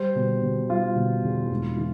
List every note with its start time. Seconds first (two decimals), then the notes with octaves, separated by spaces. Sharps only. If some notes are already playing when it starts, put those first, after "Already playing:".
Already playing: G3 C5
0.15 B2
0.42 B2
0.69 G3 F4
0.96 B2
1.23 E2
1.50 E1
1.77 E3